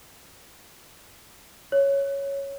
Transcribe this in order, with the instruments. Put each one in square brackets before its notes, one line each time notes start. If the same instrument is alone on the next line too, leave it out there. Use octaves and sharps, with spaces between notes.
[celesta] C#5